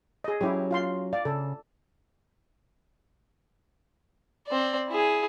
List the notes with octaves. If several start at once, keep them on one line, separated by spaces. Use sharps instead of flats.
G#4 D#5
F#3 C#4 E4 G4
F4 F5 C6
D5 F5
C#3 A4
C4 D5
E4 G#4